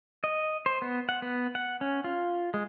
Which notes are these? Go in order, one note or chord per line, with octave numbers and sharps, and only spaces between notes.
D#5
C5
B3
F#5
B3
F#5
C#4
F4
G#3